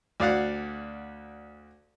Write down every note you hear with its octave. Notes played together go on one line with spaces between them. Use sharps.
D2 D5 F5 F#5